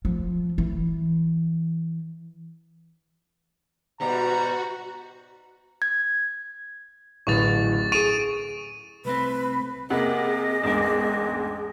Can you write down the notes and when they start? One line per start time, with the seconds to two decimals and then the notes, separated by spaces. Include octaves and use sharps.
0.05 F3
0.58 E3
4.00 G#2 B2 G3 F#4 A#5
5.82 G#6
7.27 D1 A1 C#6 A6 F7
7.92 G#4 C#6 D7 D#7 F7
9.05 C2 A3 C4 B4
9.90 C3 A#3 G4 G#4 D#5 F#5
10.63 A1 E2 G#2 D4 A#4